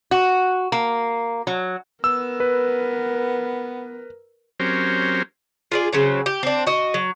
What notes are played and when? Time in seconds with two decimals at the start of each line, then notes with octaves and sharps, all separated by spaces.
0.11 F#4
0.72 A#3
1.47 F#3
2.04 B3 A#4 E6
2.40 B4
4.60 F#3 C4 C#4 G4 A#4 C5
5.72 F4 G#4 D5
5.93 C#3 F#3 C4
6.26 G4
6.43 C4 D4
6.67 F#4 D#5
6.94 F#3